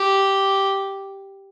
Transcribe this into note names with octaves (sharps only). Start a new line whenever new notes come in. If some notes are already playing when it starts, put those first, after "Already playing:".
Already playing: G4